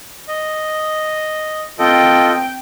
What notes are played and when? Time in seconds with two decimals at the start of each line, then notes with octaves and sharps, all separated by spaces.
0.28 D#5
1.79 C4 F4 A4 D#5 G5